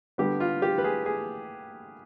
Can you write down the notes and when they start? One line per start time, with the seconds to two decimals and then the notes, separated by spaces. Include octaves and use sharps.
0.18 D3 G3 B3 G4
0.40 F4
0.62 G4
0.78 B4
0.84 G#4
1.06 G#4